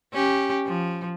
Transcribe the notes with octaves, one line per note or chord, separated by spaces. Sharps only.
C#4 G4
F3